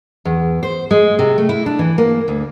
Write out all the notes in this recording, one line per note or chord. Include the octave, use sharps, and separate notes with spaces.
E2
C5
G#3
C3
A3
E4
D4
E3
A#3
D2